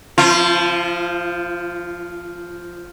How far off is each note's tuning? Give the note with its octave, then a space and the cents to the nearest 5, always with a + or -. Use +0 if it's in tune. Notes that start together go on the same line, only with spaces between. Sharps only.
F3 +0 F4 -40